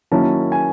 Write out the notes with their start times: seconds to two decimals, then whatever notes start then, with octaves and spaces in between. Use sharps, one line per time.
0.11 D#3 F#3 A#3 C#4 E4 A5
0.52 G#5